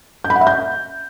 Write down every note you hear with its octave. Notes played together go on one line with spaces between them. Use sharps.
G6
B5
F#5
E5
G6